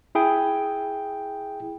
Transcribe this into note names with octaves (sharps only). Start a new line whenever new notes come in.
E4 G#4 G5